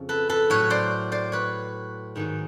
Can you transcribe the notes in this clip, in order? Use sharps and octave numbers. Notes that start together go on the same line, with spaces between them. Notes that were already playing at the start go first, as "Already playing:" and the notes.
Already playing: F2 C#3 F3
A4 B4
A4 B4
A2 F#3 B4 C#5
C5 D5
C5 D5
B4 C#5
G#2 D#3 F#3